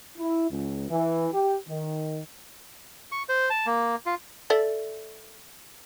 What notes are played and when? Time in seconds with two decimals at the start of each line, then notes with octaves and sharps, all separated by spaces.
0.17 E4
0.50 C#2
0.89 E3
1.33 G4
1.69 D#3
3.12 C#6
3.29 C5
3.50 A5
3.66 A#3
4.06 F4
4.50 A4 D5 E5